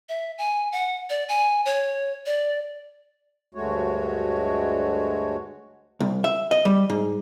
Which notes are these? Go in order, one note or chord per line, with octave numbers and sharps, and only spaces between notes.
E5
G#5
F#5
D5
G#5
C#5
D5
D2 G2 G#3 A3 F#4 C#5
C2
E5
D#5
G3
G#2